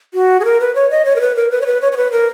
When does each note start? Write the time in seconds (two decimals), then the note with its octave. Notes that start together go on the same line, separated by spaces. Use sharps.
0.14 F#4
0.40 G#4
0.45 A#4
0.60 B4
0.75 C#5
0.91 D#5
1.05 C#5
1.16 A#4
1.21 B4
1.36 A#4
1.51 B4
1.61 C#5
1.66 B4
1.82 C#5
1.92 C#5
1.97 B4
2.12 A#4